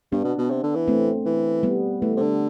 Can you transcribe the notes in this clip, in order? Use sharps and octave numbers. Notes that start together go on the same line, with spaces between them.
G2 B3 D4
B2
B2
C3
D3
E3
A3 C4
E3
G3 B3
E3 A3
C3
D3